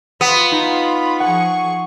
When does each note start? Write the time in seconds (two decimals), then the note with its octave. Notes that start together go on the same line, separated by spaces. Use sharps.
0.21 B3 F4 B5
0.52 D#4
1.20 F3 G#4 F#5 C#6